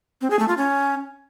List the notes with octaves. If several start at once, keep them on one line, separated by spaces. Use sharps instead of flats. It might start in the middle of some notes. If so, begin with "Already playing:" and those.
C4
G#4
A3
F4
C#4